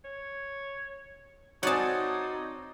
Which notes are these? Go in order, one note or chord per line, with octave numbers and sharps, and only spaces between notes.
C#5
C4 D#4 F#4 C#5 D5 F#5 A5 D#6